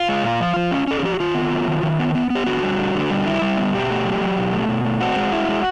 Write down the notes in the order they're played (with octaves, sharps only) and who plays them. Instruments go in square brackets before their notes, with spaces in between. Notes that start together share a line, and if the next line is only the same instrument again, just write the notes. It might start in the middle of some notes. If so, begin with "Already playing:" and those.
Already playing: [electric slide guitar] F4
G#3
A#2
F3
F3
C#4
C#4 A4
G#4
F3 G4
F#4
D#3 F4
B3
F#3
D#3
D#3
B3
B3
B3
G4
D3 F#4
G3
D3
D3
G3
E4
G3
B3
B2 G4
A3
F#3
F#3
B2
A3
B2
A3
C4 F#4
G#3
E4
G#3